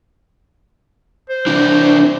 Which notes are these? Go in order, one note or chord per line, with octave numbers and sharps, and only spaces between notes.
C5
C3 E3 D4